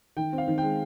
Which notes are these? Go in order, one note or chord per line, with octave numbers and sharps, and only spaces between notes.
D#3 G5
C4
F5
D#3
G#3 G5